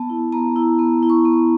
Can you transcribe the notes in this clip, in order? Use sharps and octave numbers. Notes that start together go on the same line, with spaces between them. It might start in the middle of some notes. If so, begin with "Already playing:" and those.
Already playing: B3 A5
E4
B3 A#5
E4
B3
E4
C#6
B3